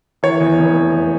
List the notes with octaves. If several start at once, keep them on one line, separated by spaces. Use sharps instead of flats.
E3 C#5
E2
F1